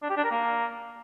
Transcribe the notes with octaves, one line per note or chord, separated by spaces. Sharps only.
D4
G4
D4
A#4
A#3